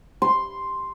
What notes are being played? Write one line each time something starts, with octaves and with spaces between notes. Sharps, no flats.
C6